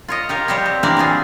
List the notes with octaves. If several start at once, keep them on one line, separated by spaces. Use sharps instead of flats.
F4 C#5 D#5
F4 G4 A#4
G3 G4 C5 C#5
C4
E3 A#3 D4 G4 A#4 D5
F#3 C4 F4 G#4